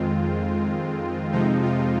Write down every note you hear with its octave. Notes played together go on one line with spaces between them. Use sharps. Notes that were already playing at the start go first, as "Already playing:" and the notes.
Already playing: F2 D#3 G#3 C4 F4
F2 C3 F3 G#3 C4 D#4
F4